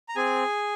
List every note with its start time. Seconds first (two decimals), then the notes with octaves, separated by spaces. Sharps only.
0.09 A#5
0.16 C4 G#4 G#5